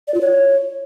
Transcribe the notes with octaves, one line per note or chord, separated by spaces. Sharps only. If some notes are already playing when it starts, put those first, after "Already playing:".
D5
F4
C#5